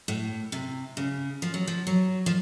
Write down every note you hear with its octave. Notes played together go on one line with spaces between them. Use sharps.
A2
C3
C#3
F3
F#3
F3
F#3
F3